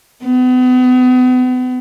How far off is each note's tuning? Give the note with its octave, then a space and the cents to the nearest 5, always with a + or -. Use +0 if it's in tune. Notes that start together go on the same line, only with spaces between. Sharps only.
B3 +40